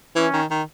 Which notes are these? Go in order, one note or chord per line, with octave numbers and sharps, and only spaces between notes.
E3 C#4
D#3
D#3